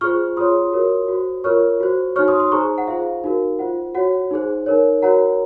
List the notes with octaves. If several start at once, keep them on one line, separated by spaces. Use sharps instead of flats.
F4 G#4 C5 C#6 F6
F4 G#4 C#5 C6 D#6
F#4 A#4 C#5
F#4 C5
F4 A#4 C#5 C#6 F6
F#4 C5
D#4 F#4 C#5 C#6 F6
C6 D#6
C6 D#6
D#4 G#4 C5 A#5 C#6
F#5
F4 G#4 C5 F5
D#4 F#4 A#4
F4 C5 F#5
F#4 C#5 F#5
D#4 G#4 C5
D#4 A#4 C#5
F#4 A#4 C#5 F#5 A#5